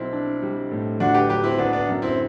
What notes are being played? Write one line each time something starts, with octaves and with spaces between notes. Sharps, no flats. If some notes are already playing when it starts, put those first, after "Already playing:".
Already playing: B1 C4 E4
D4
G3
A2
G1 D4 F#4
G4 B4
F#3 G4 B4
C4 E4
D3 B3 D4
B3 D4
F#2
C4 E4